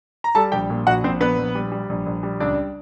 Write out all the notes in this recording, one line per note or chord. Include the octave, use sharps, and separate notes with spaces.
A#5
G3 A4 A5
A#1 G4 G5
A#2
A#1 F#4 F#5
A#1 C4 C5
A#1 B3 B4
A#1
G3
G3
A#1
A#1
G3
C#2 D4 D5